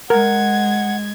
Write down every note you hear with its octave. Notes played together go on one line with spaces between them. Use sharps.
G#3 A#4 F#5 G#6